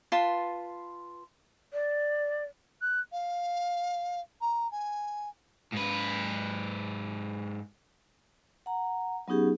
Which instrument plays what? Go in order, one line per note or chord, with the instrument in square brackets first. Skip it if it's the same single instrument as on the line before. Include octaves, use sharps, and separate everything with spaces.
[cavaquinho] F4 B4 A5 C6
[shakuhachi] D5
[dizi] F#6
F5
A#5
G#5
[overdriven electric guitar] G#2 B4
[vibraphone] F#5 A#5
F#3 B3 C#4 D#4 G4 G#4